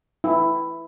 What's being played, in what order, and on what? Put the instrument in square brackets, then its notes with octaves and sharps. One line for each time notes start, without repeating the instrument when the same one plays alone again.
[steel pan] E4